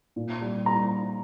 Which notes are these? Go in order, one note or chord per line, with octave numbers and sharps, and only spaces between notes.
A#2
G3
G3 A#5